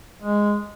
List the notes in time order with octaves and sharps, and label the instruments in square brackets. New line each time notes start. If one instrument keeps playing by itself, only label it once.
[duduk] G#3